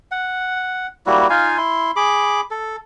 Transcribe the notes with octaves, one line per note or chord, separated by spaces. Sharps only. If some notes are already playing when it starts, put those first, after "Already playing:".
F#5
G3 A#3 E4 F#4
D#4 F4 F5 G#5
E4 C6
G#4 B5 D6
A4